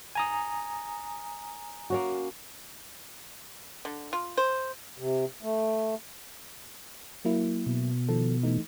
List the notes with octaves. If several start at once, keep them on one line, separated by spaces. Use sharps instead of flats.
G#5 A#5 D#6
A#3 C#4 F#4
D3
F4
C5
C3
A3
F#3 A#3 E4
B2
D#3 F3 A4
E3 A3 D#4